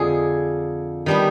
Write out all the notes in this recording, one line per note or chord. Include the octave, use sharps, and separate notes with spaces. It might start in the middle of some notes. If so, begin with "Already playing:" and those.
Already playing: F2 D3 F3 G#3 G#4
D#3 G3 B3 D4